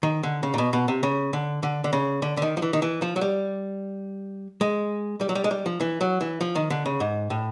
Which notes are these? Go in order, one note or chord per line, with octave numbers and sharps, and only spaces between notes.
D#3
D3
C#3
A#2
B2
B2
C3
C#3
D3
D3
D3
C#3
D3
D3
D#3
F3
E3
D#3
E3
F3
F#3
G3
G#3
G3
F#3
G3
G#3
G3
F3
E3
F#3
E3
F3
D#3
D3
C#3
G#2
A2